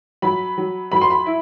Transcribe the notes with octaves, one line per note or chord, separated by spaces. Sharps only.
F#3 B5
F#3
F#3 B5
C6
B5
E4